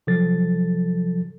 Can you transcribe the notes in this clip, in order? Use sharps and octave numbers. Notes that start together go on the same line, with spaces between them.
C3 F3 F#3 A4 A6